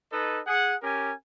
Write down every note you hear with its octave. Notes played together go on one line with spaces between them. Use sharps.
D#4 A4 B4 D#5
G#4 F#5
C#4 G4 A#4 G#5